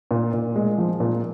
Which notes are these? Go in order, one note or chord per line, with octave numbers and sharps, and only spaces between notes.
A#2
A#2
G#3
F3
A#2